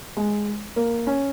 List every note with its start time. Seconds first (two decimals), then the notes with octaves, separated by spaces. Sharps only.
0.17 G#3
0.76 A#3
1.07 C#4